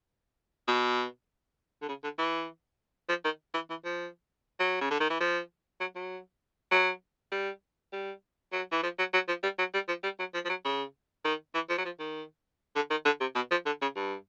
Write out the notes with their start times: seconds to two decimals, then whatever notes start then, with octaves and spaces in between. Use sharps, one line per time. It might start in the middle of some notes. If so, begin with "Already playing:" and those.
0.68 B2
1.82 D3
1.88 C#3
2.03 D3
2.18 E3
3.09 F3
3.25 D#3
3.54 E3
3.70 E3
3.84 F3
4.60 F#3
4.81 C#3
4.91 D3
5.00 D#3
5.10 E3
5.20 F3
5.80 F#3
5.96 F#3
6.71 F#3
7.32 G3
7.93 G3
8.52 F#3
8.72 E3
8.83 F3
8.98 F#3
9.13 F#3
9.28 F3
9.43 G3
9.59 F#3
9.74 G3
9.88 F3
10.03 G3
10.19 F#3
10.34 F3
10.45 F3
10.49 F#3
10.65 C#3
11.25 D#3
11.54 E3
11.69 F3
11.78 F#3
11.85 F3
11.99 D#3
12.76 D3
12.90 D#3
13.05 D3
13.21 C3
13.35 B2
13.51 F3
13.66 D3
13.82 C#3
13.96 G2